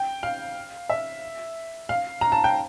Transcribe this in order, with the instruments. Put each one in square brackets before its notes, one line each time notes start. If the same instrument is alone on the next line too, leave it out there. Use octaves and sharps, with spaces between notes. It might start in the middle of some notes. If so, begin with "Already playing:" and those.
Already playing: [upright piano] G5
F5
E5
F5
A#5
A5
G5